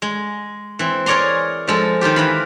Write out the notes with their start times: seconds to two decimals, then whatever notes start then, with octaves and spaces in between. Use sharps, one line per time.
0.02 G#3
0.79 E3 C4
1.06 G#4 A#4 C#5 D5 A#5 C6
1.68 F3 G#3 A4
2.01 D#3 D#4 F4 G4
2.16 E3 F5 B5